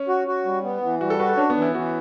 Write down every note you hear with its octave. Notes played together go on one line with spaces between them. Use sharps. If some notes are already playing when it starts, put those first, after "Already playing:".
Already playing: C#4
F#4
F#4
G3
B3
E3
G3 F#4
A4
F#4 B4
A4
C#4 D4
B3
E3
E4
E3 F#4